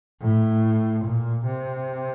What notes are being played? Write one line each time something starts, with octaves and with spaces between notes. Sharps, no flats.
A2
A#2
C3